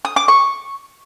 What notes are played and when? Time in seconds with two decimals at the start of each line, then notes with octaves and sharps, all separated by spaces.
0.05 D#6
0.16 D6
0.28 C#6